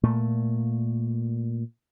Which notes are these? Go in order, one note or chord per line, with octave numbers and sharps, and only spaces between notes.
A#2 A3